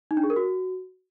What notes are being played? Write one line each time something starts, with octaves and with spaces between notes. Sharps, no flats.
D#4
D4
G#4
A#4
F#4